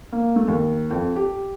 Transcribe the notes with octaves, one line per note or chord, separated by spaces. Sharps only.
A#3
A3
D#2
F2
G4